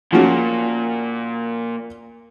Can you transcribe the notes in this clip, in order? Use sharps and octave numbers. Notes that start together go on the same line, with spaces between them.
A#2 F3 C#4 F#4